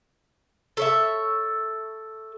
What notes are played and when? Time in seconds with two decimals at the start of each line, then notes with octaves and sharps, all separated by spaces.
0.77 A4 C#5 E5